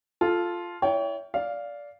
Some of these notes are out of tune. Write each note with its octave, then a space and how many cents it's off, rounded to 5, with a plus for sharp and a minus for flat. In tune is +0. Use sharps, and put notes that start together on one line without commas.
F4 +0 A4 -10
E4 +0 C#5 +35 G5 +0
D5 -15 F5 +0